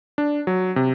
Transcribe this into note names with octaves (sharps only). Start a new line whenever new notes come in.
D4
F#3
C3